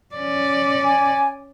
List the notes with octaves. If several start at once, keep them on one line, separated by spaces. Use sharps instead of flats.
C#4 D5
G#5